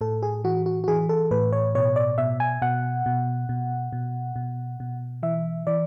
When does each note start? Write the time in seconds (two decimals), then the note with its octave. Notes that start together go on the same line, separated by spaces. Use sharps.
0.01 A2 A4
0.23 G#4
0.44 E3 F#4
0.66 F#4
0.84 F#4
0.88 E3 G#4
1.09 A4
1.31 A2 B4
1.52 C#5
1.75 B2 C#5
1.96 D5
2.18 B2 E5
2.40 G#5
2.62 B2 F#5
3.06 B2
3.49 B2
3.93 B2
4.36 B2
4.80 B2
5.23 E3 E5
5.67 E3 D5